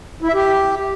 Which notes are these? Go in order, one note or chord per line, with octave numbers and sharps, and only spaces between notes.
E4
E5
G4